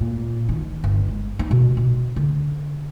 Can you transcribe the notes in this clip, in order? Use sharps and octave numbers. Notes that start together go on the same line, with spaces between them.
A#2
D#3
G1
G#3
D#4
B2
B2
D3